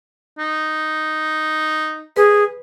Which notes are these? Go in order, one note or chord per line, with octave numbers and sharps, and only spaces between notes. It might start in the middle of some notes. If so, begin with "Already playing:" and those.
D#4
G#4 B4